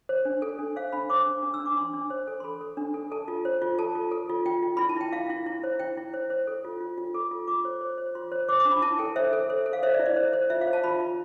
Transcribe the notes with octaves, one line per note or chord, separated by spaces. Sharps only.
C5
D4
A4
D4
C5 F5
D4 B5
C5 D6
D4
D4
E6
D4
D6
D4 C6
D4
C5
A4
C6
A4 B5
A4
D4
A4
A4 A5
F4
C5
F4
A4 A5
F4
A4
F4
F4 G5
F4
E4 B5
A5
E4 G5
E4 F5
E4
E4
C5
E4 G5
E4
C5
C5
A4
F4
F4
F4
A4 D6
F4
F4 D6
C5
C5
C5
F4 C6
C5
C5 D6
D6
D4
B5
E4 A5
A4 G5
C5 E5
A4
C5
A4
F5
C5 E5
D5
E4
D5
C5
C5
F4 E5
F5
C5
A5
F4 B5
F4